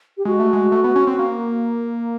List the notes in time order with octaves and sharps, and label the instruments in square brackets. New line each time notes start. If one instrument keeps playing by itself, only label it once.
[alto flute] G4
[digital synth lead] G#3 [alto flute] F#4
[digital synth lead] A3
G#3
A3
B3
C#4
C4
A#3